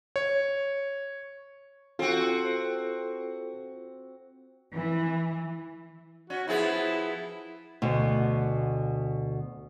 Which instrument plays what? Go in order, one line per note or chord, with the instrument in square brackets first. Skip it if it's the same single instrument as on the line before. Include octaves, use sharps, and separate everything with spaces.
[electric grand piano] C#5
[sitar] C4 F#4 [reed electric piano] F4 A4
[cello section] E3
[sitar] C#4 [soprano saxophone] F#4
[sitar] F3 B3 G#4 [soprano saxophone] E4
[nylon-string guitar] D2 B2